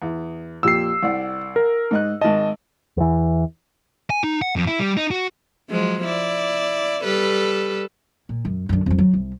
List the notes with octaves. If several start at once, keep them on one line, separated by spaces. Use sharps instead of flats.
E2
F2 A#2 G4 E6 C7
C2 D5 F#5
A#4
G#2 D#5 F#6
G#1 D#5 A5
E2 E3
G#5
D#4
F#5
F2
E4
G3
D#4
F#4
F3 F#3 G#3
E4 D5
G3 A4 B4
A#2
F#2
F#2 D3
F2 F#3
F#3
C2